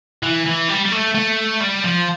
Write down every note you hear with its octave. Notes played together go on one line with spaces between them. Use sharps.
E3
E3
G3
G3
A3
A3
G3
F3